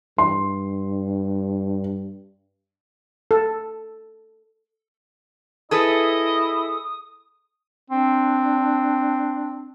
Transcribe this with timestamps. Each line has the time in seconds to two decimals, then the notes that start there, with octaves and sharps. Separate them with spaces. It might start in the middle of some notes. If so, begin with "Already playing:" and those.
0.18 G2 C6
3.31 A4
5.71 E4 G#4 A4 B4 D#5 D#6
7.90 C4 D4